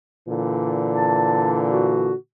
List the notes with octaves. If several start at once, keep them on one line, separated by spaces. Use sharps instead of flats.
A#2 D3 E3
A5
F#4